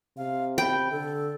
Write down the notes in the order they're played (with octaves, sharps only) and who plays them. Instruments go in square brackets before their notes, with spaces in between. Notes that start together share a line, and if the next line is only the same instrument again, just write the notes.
[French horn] C3 [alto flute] F5
[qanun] G5 [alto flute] B5
[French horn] D3 [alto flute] A4